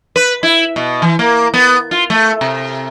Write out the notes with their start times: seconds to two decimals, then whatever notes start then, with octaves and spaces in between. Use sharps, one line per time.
0.16 B4
0.43 E4
0.76 B2
1.02 E3
1.19 A#3
1.54 B3
1.91 F4
2.10 A3
2.41 C3